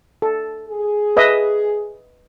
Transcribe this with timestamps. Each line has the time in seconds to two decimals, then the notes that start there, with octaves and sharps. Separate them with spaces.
0.22 A4
0.68 G#4
1.17 B4 D#5 E5